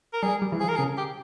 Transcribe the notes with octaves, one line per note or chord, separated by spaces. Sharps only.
A#4
G3 G#4
G3
E3
F3 G#4
A#4
C#3 G#4
G4